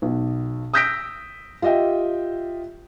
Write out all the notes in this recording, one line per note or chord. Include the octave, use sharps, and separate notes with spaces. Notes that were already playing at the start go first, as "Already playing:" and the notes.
B1
D#6 E6 G6 A#6 B6 D7
F4 G4 D#5 E5 G5